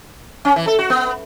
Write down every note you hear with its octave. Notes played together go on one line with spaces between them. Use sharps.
C#4
E3
A4
F#4
B3